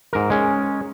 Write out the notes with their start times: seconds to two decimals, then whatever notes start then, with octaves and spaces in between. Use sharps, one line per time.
0.13 G#2 A#4
0.30 G#3 C#4